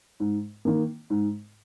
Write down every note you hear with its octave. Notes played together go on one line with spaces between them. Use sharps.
G#2
D#3 A#3
G#2